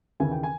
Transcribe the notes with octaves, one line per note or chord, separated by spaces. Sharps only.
D#2 C#3 E3 G#5
G5
G#5